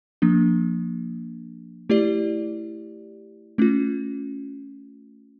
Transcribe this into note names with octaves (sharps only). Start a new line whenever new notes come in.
F3 A#3 D4
A3 E4 G4 D5
A3 C#4 F4